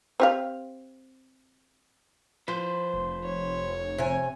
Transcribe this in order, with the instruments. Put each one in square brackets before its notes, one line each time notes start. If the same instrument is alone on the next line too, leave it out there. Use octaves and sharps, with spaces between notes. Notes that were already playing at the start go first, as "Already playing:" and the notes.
[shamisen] C4 G4 F5
[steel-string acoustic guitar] F3 [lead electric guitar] B4 C5
[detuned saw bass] F1
[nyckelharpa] C#5
[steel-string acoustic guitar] C3 G#5